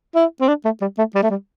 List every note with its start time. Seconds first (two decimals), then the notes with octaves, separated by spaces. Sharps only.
0.15 E4
0.41 C4
0.48 D4
0.65 A3
0.81 G3
0.98 A3
1.15 G3
1.23 A3
1.30 G3